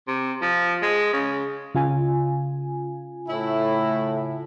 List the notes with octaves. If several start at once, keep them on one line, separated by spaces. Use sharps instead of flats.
C3
F3
G#3
C#3
C#3 F4 G#5
A2 E4